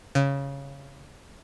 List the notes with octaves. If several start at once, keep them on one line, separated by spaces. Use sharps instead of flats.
C#3